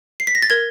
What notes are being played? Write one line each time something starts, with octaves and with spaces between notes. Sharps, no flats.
C7
B6
A#6
A6
A#4 G#6